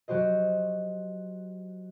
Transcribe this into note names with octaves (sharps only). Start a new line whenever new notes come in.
F#3 F#4 G4 C5 D#5